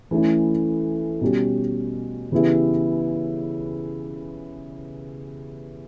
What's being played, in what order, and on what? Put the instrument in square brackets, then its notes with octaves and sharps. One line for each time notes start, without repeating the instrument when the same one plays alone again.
[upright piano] E3 A3 C#4 E4
B2 G3 C#4 G4
C#3 E3 B3 E4 G4